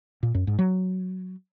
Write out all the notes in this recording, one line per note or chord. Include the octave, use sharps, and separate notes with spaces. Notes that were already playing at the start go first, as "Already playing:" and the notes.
A#2
F#2
G#2
F#3